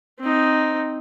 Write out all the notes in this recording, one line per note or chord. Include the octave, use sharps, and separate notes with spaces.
C4 D#4